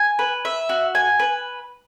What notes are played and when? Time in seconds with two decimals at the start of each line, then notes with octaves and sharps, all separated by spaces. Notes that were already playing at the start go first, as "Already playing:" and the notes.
Already playing: G#5
0.19 B4
0.45 E5
0.69 F#4
0.95 G#5
1.19 B4